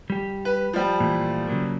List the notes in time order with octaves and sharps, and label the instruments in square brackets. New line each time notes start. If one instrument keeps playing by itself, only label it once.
[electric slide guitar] G3 G4
[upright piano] B4
F3 G3
[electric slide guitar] A#2 E3 A3
C#3 F#3 A#3